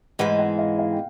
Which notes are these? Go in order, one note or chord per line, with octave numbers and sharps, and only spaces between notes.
G#2 E3 G#3 F#5
F#5
F5
F5
G5